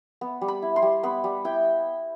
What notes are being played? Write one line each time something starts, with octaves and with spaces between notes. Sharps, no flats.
B3
G3
B5
E4
C6
G3
B3 B5
G3
E4 G5